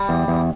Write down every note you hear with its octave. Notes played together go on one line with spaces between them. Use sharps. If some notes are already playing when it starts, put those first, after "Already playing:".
Already playing: G3
E2
E2